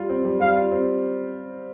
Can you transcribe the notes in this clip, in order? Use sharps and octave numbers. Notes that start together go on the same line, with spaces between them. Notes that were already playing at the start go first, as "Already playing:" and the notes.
Already playing: G3 F4
C4
G3
G3 F5
F4
C4